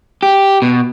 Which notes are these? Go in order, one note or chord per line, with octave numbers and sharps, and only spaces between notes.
G4
B2